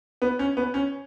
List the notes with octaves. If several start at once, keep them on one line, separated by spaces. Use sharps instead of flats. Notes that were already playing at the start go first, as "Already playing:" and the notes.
B3
C#4
B3
C#4